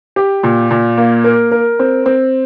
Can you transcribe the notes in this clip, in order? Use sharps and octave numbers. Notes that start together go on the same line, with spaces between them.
G4
A#2
A#2
A#3
A#4
A#4
C4
C4